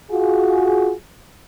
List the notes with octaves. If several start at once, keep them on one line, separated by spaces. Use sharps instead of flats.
F4 F#4 G#4